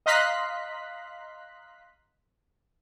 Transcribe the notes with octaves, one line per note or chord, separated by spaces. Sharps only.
D#5 F5 A#5 C6 F#6 B6